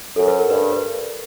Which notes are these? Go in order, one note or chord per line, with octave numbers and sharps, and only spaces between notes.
F#2 A4
B4
A#4
G2 B4
B4